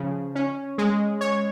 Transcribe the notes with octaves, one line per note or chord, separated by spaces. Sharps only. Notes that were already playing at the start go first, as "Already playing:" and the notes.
Already playing: C#3 F3
C#4
G#3
C#5